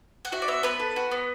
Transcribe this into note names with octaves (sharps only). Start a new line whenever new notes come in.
F#5
F#4 E5
D5
B3 E5
B3 B4
A4
F#4
B3